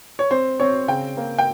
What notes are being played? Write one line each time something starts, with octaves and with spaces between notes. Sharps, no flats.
C#5
C4 C5
C4 C#5
C#3 G5
A#3
G5